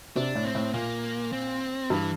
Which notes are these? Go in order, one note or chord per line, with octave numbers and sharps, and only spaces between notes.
C3 D4
A2
C4
A2
A#2 A#3
C4
G2 E3